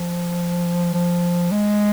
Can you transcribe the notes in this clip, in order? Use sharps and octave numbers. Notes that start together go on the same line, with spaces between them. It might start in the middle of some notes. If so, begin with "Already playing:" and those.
Already playing: F3
F3
G#3